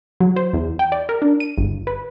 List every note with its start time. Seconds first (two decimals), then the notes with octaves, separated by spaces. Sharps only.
0.20 F#3
0.36 C5
0.53 E2
0.79 G5
0.92 D5
1.09 A#4
1.22 D4
1.40 D#7
1.58 G1
1.87 B4